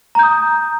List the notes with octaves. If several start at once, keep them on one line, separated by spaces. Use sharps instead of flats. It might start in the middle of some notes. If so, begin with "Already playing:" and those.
A#5 D#6 G6